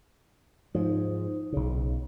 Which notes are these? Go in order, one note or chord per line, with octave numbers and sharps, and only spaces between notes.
G#2 F3 D#4
B1 C#3